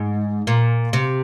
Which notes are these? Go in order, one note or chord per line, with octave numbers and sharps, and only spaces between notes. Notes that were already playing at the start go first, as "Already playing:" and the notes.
Already playing: G#2
A#2
C3